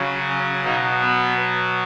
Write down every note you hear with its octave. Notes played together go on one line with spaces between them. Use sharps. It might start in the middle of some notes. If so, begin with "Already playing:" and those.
Already playing: C#3 F#3
C#4
B2 F#3 D#4
B3